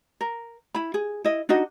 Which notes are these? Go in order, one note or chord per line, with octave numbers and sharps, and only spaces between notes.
A#4
E4 B5
G#4
E4 D#5
D4 D#4 F#4 D#5